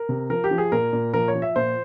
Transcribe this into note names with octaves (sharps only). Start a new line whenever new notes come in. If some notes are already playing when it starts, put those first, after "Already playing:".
Already playing: A#4
C3
F3 A#4
G4
F3
G#4
A#2 A#4
A#2
F3 A#4
C#5
F3
E5
A#2 C5